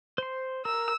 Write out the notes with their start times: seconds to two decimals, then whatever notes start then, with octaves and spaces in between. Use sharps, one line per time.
0.18 C5 C6
0.65 A#4 E6